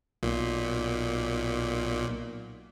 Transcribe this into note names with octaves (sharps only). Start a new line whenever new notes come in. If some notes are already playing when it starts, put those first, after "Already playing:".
B1 A#2